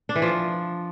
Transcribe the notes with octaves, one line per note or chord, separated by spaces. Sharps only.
D4
E3
F3